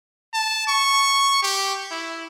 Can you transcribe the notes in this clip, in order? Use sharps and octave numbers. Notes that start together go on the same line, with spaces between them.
A5
C#6
G4
E4